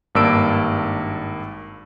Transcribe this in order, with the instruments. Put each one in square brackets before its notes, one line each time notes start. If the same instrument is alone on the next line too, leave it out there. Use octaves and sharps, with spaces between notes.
[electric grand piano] G#1 G2 A#3 D4 E6 D7